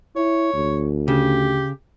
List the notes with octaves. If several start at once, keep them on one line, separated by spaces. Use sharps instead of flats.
E4 C#5
D2
C#3 G4